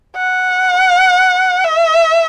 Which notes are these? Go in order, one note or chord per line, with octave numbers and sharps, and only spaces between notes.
F#5
E5